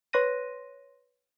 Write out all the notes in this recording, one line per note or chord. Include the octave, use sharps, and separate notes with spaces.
B4 C#5 C6 F#6 A#6 D#7